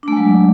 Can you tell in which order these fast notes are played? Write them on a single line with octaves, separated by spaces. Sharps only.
D4 A3 G#3 F#3